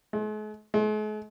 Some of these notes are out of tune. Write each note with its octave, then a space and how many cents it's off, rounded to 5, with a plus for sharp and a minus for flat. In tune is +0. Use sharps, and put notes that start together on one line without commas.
G#3 +45
G#3 +45